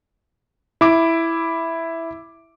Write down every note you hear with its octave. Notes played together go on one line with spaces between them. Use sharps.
E4 D6